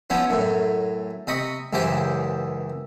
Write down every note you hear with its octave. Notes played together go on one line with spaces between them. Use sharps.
F3 B3 C#4 E4
F#2 A2
C3 D#5 B5 C#6
C#2 F#2 E3 G4 C5 G5